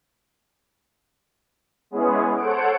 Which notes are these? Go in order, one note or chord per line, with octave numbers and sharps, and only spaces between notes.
G#3 B3 C#4 E4 G#4
A4 C5 C#5 F#5 D7